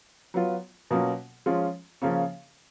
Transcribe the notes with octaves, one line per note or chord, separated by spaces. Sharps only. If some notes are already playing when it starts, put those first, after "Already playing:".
F#3 B3 F4
B2 F#3 A#3 C#4 F4
F3 G#3 C#4 F4
C#3 F3 A#3 C#4